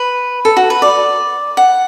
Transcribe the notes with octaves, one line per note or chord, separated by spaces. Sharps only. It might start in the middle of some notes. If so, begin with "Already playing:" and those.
Already playing: B4
A4
F#4
B4
D5
F#5